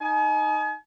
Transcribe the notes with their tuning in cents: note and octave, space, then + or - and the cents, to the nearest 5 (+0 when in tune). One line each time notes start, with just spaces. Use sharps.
D#4 +0 G#5 +40